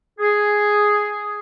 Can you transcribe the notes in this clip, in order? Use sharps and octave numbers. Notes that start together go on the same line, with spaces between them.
G#4